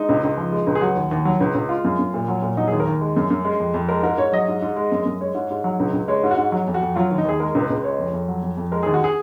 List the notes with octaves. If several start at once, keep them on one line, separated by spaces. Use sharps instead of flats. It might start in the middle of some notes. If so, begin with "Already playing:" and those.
Already playing: G#3 D#4
C#2
C#2
F3
G#3
C#2
G#4
F#3 F#4
D#2
D#2
F#3
C#2
C#2
G#3 F4
F#2
F#2
A#2
F#3
A#2
F#3 D#4
D#2 G#4
A#4
D#2
G#3
F#2
F#2
G#3
F2
F2
G#3 A#4
G#2 A#4
G#2 C#5
F#3 D#5
G#2
G#2
G#3
F#2
F#2
G#3 C#5
G#2
G#2
F#3
C#2
C#2
G#3 C#5
G#2
F#4
G#2
F#3
F2
F#4
F2
F#3 F4
D#2
D#4
D#2 G#4
G#3 A#4
C#2
B4
C#2
G#3 C#5
F2
F2
F#3
F2
F2
G#3 A#4
D#2 G#4
F#4
G#4